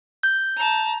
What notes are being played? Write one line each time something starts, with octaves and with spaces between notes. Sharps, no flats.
G6
A5 A#5